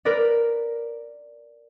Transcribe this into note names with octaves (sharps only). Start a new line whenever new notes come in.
A#4 B4 D5